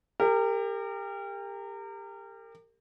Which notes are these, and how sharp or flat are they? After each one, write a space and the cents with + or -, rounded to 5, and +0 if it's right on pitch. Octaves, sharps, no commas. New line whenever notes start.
G4 +30 A#4 -30